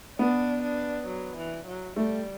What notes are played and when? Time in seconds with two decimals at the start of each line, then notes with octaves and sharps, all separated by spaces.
0.19 B3 D4
0.63 D4
1.07 F#3
1.37 E3
1.67 F#3
1.96 G3 A3